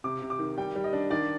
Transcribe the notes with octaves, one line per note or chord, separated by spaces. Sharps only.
C3 D6
C3
D6
D#3
G3 G5
G3
D#5
D4
D#3 D5